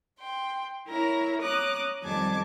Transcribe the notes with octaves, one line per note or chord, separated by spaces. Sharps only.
G5 C6
E4 A#4 C#5 A#5
C#5 A#5 D6 D#6 F#6
F2 D#3 G3 G#5 A5 D6